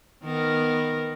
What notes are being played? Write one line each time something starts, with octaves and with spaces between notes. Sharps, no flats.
D#3 B3 A#4